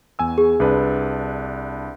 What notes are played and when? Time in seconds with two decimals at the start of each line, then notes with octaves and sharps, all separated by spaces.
0.19 E2 G#5 E6
0.38 G#4
0.60 C2 D4 B4